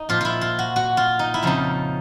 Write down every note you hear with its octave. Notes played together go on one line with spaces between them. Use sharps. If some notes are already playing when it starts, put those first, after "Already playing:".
Already playing: D#4
A#2 F3 F4
E4 F4
F4
F#4
F#4
F4
D#4
E4
F2 C#3 F3 D#4